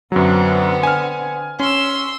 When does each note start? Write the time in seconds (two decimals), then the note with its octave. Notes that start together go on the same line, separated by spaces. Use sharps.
0.12 F#2 D3 F#3 B3 C4
0.83 G#5 F6
1.60 C#4 C6 E6